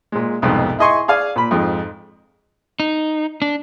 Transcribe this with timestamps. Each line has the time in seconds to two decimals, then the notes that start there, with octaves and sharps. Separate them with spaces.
0.12 A#2 G#3
0.42 C2 F2 G#2 B2
0.79 E4 G#4 D#5 G#5 C6 C#6
1.08 G#4 D5 F5 G#5
1.36 A#2 B5
1.51 F2 G#2 F3
2.80 D#4
3.42 D4